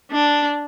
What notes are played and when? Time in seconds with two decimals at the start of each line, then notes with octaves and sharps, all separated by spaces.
0.12 D4